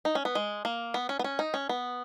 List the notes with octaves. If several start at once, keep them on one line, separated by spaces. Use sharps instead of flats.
D#4
C#4
B3
G#3
A#3
B3
C#4
B3
C#4
D#4
C#4
B3